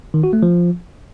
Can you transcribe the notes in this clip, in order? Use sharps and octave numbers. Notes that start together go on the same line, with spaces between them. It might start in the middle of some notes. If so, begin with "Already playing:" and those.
D#3
F#4
A3
F3